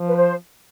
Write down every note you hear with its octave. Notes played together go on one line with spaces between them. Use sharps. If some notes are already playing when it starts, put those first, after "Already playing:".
Already playing: F3
B4
C5